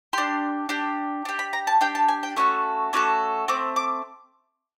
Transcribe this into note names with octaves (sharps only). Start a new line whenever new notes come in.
D4 G4 C6
D4 G4
D4 G4
B5
A#5
A5
D4 G4 G5
A5
G#5
G5
A3 C#4 F#4 A4 C#6
A3 C#4 F#4 A4 D6
A3 C4 D6
D6